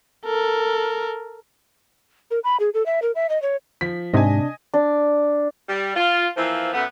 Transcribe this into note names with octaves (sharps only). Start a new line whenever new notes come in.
A4 A#4
A#4
B5
G#4
A4
E5
A#4
E5
D#5
C#5
F3 B6
G#2 C3 D4 D#5 G#5
D4
G3
F4
E3 F3 A#3 C4
F#2 A3 B3